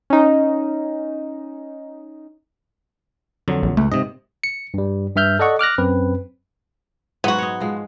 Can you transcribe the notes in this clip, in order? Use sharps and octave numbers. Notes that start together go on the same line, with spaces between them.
C#4 D#4
F2 D3 F#3
A#1
C#2 A3
G#2 C3 D#5
C#7
G2 G3
G2 E5 F6 G6
A4 D5 D#5 F#5 C#6
D6 F6 F#6 A#6
F#2 C4 B4
G#2 F#3 B3 F#4
C#5 D#5
F3 G#3